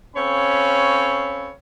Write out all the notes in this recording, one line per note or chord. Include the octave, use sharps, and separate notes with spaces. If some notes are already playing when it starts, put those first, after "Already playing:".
C4 C#4 A4 C#5 F5 B5